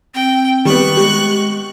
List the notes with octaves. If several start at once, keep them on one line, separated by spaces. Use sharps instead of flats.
C4 G5
D#3 G3 B3 C#6 F#6
G#3 G4